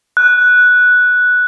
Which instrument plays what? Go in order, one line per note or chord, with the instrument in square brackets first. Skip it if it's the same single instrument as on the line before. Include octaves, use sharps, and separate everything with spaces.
[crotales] F#6